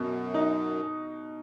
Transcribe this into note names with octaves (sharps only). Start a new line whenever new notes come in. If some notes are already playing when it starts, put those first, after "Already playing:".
Already playing: F#2 B2
D#4